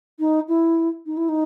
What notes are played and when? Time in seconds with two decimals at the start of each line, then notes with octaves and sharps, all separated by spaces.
0.19 D#4
0.48 E4
1.06 D#4
1.17 E4
1.28 D#4